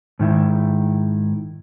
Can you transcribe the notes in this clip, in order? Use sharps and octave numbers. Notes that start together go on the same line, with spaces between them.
G#2 D#3 E4